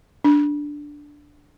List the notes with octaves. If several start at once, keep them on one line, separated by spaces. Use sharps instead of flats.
D4